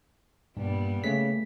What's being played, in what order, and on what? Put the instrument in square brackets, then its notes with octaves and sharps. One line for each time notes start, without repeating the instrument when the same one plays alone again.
[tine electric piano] G2 [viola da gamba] A#2 G3 B3
[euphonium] C#3 [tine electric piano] A3 B6